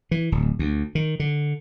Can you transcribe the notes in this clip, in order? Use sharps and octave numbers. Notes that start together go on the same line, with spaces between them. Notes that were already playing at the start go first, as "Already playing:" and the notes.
E3
D1
D2
D#3
D3